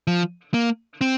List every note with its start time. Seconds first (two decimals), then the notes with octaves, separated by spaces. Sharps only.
0.07 F3
0.54 A#3
1.01 C4